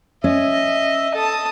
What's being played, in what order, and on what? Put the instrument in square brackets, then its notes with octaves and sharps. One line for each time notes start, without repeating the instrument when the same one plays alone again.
[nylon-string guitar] C#4 [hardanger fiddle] D#5 [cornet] E5
[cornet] A4 [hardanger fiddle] A5 D#6